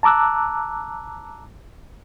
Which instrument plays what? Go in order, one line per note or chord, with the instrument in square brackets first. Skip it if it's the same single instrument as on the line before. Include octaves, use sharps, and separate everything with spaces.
[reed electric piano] A5 A#5 D6 E6 F#6